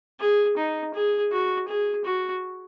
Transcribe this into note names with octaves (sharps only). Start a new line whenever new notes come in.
G#4
D#4
G#4
F#4
G#4
F#4